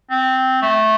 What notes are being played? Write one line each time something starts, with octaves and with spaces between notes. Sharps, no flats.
C4
A3